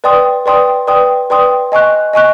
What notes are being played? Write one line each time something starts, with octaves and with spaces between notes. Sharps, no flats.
B4 D5 G5 C6 D#6
B4 D5 G5 C6 D#6
B4 D5 G5 C6 D#6
B4 D5 G5 C6 D#6
D#5 G#5 C#6 F#6
D#5 G#5 C#6 F#6